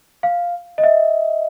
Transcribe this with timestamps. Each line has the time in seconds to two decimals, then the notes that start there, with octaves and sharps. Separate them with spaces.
0.23 F5
0.78 D#5
0.84 E5